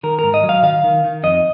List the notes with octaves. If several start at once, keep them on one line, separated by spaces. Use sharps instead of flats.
D#3 A#4
G#2 A#4
D#5
F#3
F5
D#3 F5
D#3
D#3
F2 D#5